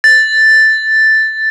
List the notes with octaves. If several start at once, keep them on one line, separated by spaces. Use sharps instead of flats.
A6